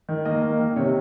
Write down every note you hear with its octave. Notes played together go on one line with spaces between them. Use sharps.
D#3
A#3 D#5
A#3
D#3
C3 C#5